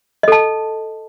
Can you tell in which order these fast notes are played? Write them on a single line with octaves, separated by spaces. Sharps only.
D#5 A4 A5